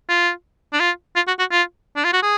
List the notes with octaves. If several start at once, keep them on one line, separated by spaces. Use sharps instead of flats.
F4
D4
F4
F4
F#4
F#4
F4
D4
F4
F#4
G#4